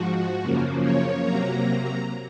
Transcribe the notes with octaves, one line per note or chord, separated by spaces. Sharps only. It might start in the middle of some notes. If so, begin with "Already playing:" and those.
Already playing: G#2 F3 F#4
F#2 C#3 F3 A#3
C#5
C3 F#3 A#3 A#5